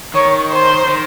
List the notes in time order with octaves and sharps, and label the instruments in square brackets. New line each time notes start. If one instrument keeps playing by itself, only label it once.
[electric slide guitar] D#3 [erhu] C#5
[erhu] C5
[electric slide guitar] D#3